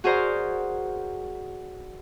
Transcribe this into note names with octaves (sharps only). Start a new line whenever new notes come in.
F#4 G#4 A#4 C5 D5 A#5